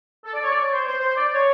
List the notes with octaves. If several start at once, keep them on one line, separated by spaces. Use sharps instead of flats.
A4
D5
C#5
D5
C#5
C5
C5
C5
D5
C#5